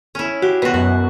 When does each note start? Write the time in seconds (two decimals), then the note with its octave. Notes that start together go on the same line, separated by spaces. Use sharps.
0.15 C#4 E4
0.42 F#4 G4
0.62 B2 F#4 B4
0.74 F#2 F#4